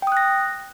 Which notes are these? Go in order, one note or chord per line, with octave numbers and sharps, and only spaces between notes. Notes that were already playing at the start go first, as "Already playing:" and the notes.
G5 D#6 F#6 A#6